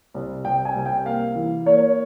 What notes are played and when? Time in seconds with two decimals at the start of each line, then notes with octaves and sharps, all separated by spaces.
0.14 C2
0.45 C2 G5
0.65 G#5
0.75 C2
0.86 G5
1.05 A#3 F5
1.36 E3
1.66 A#3 C#5